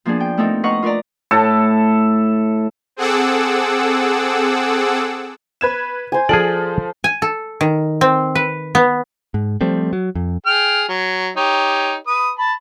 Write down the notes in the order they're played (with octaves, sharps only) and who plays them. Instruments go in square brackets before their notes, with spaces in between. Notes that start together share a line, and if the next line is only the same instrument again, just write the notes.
[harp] F3 A#3 B3 D4 G#4
G5
A3 B3 C4 D#4 A4 A#4
B4 D#5 F5 F#5 A#5 C#6
F4 A#4 B4 D5 A#5
[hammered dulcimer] A2 A4
[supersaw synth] C4 G#4 A4 F#5 D6 E6
[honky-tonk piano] B4 G#6 E7
[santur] C5 G#5
[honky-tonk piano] F3 F#7 [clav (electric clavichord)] G#4 D5 [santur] A4
[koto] G#5
A4
D#3
C4
B4
B3
[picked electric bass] G#2
F3 G3 A3 C4
F#3
F2
[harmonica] G#4 G5 F6
F#3
D#4 G4 C#5
B4 D#6
A5 B5